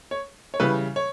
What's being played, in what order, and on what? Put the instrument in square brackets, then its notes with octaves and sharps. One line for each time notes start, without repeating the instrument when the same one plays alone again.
[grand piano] C#5
C#5
C#3 E3 G3 B4
C#5